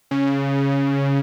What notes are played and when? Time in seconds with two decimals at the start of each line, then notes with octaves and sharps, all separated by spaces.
0.11 C#3